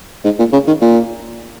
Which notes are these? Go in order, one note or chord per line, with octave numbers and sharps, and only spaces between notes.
G#2
A#2
C#3
D#3
A#2